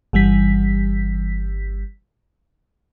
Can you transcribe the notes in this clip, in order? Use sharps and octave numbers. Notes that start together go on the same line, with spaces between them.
G1 E3 G3 B6